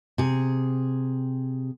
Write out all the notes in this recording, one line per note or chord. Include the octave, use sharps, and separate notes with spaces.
C3 G#4